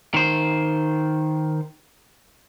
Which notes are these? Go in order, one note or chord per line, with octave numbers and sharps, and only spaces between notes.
D#3 C5